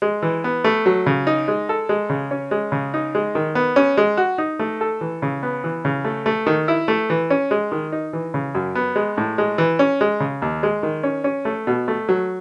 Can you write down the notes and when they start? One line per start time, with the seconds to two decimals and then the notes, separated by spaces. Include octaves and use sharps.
0.02 G#3
0.22 E3
0.44 B3
0.64 A3
0.86 F#3
1.06 C#3
1.27 D#4
1.48 G#3
1.69 A4
1.89 G#3
2.10 C#3
2.31 C#4
2.51 G#3
2.72 C#3
2.94 D#4
3.15 G#3
3.35 D#3
3.55 B3
3.76 C#4
3.97 G#3
4.17 F#4
4.38 D#4
4.59 A3
4.81 A4
5.01 E3
5.22 C#3
5.43 B3
5.64 E3
5.85 C#3
6.05 A3
6.26 A3
6.47 D#3
6.68 E4
6.88 A3
7.10 E3
7.30 C#4
7.51 G#3
7.72 D#3
7.92 D#4
8.13 E3
8.34 C#3
8.55 F#2
8.75 B3
8.96 G#3
9.18 A2
9.38 G#3
9.58 E3
9.79 C#4
10.01 G#3
10.20 C#3
10.42 D#2
10.63 G#3
10.83 D#3
11.03 C#4
11.24 C#4
11.45 A3
11.67 B2
11.88 A3
12.09 F#3